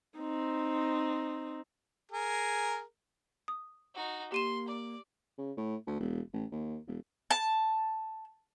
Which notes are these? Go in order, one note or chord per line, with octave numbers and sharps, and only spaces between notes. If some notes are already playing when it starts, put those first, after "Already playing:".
C4 D#4
G#4 A#4
D#6
D#4 F#4
A#3 G4 C6 D#7 E7
D5
C#3
A2
D2
E1
A1
D#2
E1
A5